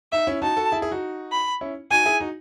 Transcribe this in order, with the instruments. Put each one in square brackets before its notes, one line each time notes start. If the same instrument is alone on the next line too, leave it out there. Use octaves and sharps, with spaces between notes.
[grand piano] D#4 [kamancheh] E5
[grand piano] C#4 E4
[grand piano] D#4 F#4 [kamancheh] A5
[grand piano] F#4 A4
E4 G#4
E4 G#4
D#4 F#4
[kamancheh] B5
[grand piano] C#4 E4
[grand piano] D#4 F#4 [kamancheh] G#5
[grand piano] E4 G#4
D#4 F#4